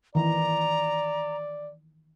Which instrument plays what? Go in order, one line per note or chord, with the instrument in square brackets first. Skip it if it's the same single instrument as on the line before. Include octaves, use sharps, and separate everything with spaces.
[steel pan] D#3 E3 [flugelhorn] D5 [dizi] A#5